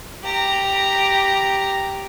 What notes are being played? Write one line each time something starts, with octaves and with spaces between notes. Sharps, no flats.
G4 A#5